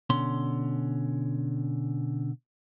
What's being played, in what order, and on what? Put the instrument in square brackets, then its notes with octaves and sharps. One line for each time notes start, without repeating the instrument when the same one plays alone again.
[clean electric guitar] B2 D3 C#4 C6